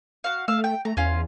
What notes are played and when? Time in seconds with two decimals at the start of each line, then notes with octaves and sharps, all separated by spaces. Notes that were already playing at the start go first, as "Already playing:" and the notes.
0.24 F#4 F5
0.48 A3 F5 E6
0.64 G5
0.85 A3 A#5
0.97 E2 C#4 F4